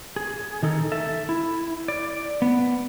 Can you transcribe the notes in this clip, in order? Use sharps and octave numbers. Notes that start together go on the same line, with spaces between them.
G#4
D#3 D#4 A4
A4 E5
E4
D5
B3